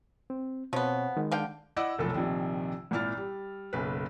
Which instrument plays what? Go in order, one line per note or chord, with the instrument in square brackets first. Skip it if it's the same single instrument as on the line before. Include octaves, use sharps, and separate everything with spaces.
[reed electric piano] C4
[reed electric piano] B2 C4 C#5 [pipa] F3 B3
[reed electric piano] D#3 G#3
[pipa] D3 F5 G5
[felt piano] E4 D5 D#5 F#5 D6 E6
F1 B1 F3 A4
A#1 C3 D#3 F3
G#1 A#2 E4 F6 A6
G3
F#1 B1 B4